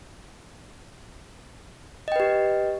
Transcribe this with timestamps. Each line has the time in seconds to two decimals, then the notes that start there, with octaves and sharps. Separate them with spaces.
2.08 D#5
2.12 G5
2.16 B4
2.20 G4